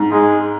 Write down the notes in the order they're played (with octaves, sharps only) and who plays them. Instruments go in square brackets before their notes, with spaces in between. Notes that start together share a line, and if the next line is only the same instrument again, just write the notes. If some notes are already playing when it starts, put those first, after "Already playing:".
Already playing: [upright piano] G#2
[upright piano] G#2 [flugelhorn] G#3